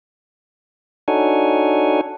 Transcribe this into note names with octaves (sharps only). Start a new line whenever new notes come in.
D4 D#4 F#4 A4 C#5 G#5